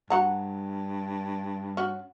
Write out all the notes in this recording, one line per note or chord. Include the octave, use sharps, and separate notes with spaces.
G2 F#4 F#5 A#5
C#4 F#4